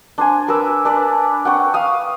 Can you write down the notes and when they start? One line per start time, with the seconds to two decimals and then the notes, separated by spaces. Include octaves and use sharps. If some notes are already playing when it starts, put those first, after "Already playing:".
0.18 D4 C5 G#5
0.48 A#4 B4 D6 E6
0.85 D4 B4 D5
1.45 F#5 G5 C#6
1.74 F5 D#6